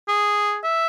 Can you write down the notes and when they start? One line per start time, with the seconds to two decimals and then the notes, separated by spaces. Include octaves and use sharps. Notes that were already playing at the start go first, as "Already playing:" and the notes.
0.08 G#4
0.64 E5